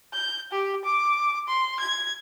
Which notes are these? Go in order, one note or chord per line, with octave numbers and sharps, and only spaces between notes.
G6
G4
D6
C6
G#6